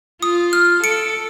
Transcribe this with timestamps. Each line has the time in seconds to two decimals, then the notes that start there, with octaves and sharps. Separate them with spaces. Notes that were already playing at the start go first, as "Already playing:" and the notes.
0.23 F4 D#6
0.53 F6
0.84 A4 C#7 D7